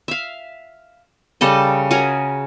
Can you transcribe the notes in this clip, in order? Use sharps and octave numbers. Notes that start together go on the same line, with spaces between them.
E5 F5
C#3 G3 A4 D#5
C#4 F#4 G#4 A#4